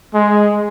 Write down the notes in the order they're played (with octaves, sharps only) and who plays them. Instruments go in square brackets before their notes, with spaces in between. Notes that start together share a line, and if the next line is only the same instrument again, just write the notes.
[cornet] G#3